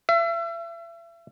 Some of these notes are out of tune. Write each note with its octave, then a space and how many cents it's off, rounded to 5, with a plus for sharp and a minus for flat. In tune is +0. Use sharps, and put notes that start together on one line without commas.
E5 +35